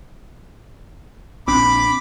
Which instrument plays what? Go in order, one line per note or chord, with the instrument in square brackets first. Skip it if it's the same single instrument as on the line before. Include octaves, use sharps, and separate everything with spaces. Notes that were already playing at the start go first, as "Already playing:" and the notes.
[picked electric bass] A#1 C4 D4 [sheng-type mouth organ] B5 D6